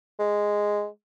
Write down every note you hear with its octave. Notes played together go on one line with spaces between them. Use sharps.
G#3